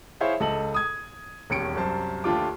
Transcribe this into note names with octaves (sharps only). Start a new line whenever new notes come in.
E4 G#4 C5 C#5 E5 F5
C#2 A4 D#5 F#7
D#6 G#6
E1 D#2 C#4 C#7 D7
C2 F#2 C5 A5
D#2 A3 D4 F4 D6